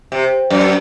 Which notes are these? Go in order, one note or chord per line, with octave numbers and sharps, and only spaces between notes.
C3
F#2